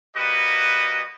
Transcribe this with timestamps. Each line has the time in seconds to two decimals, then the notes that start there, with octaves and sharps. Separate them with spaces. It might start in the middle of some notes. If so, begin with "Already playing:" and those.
0.16 G3 A#3 F#4 B4 D#5